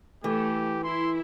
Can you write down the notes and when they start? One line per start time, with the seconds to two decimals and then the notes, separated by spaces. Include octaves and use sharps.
0.24 E3 A3 G4
0.84 E4 C6